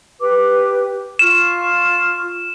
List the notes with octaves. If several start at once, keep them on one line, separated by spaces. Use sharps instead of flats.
G4 B4 D6
F4 C#6 F6 E7